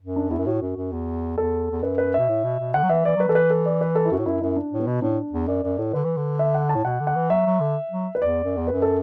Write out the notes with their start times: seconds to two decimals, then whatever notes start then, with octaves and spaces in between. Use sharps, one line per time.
0.01 F#2
0.16 D4
0.30 E2 E4
0.39 F#2
0.46 A2 F#4
0.62 F#2
0.77 F#2
0.92 E2
1.37 E2 A4
1.71 E2
1.83 F#2 B4
1.98 B4
2.14 B2 E5
2.29 A2
2.44 B2
2.59 B2
2.74 D3 F#5
2.83 F#3
2.89 E3 E5
3.05 E3 D5
3.16 F#3 B4
3.28 E3 A4
3.35 B4
3.50 A4
3.66 D5
3.81 B4
3.95 A4
4.05 E4
4.11 F#2 F#4
4.19 A2
4.26 F#2 E4
4.41 F#2 E4
4.56 D4
4.72 A2
4.80 B3
4.87 B2
5.02 A2 D4
5.32 E2
5.48 F#2 D5
5.63 F#2 D5
5.78 A2 A4
5.93 D3 B4
6.05 E3
6.17 D3
6.39 E5
6.54 F#5
6.69 A5
6.75 A2
6.85 B2 F#5
7.00 D3
7.07 F#5
7.16 E3
7.30 F#3 E5
7.46 F#3
7.61 D3
7.92 F#3
8.15 B4
8.21 E2 D5
8.44 F#2
8.57 E2
8.67 F#2 B4
8.82 A4